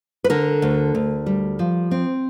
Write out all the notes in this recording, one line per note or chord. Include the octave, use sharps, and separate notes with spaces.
B4
D3 A#4
D2
D2
G3
F3
C4